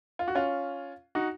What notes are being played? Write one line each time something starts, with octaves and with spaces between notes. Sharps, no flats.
F4
F#4
C#4 F4
D#4 F#4